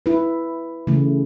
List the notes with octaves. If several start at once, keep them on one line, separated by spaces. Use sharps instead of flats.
E4 B4
C#3 E3 A3